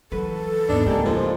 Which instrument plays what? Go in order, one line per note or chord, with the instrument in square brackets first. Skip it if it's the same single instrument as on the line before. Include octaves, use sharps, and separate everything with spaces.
[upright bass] E3 F#3 [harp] F#4 B4 [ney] A4
[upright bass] D#2 G#2 [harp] B3 D#4 [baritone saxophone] D4
[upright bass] C#2 C4 [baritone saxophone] G3 [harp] G#3 A#3
[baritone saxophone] F3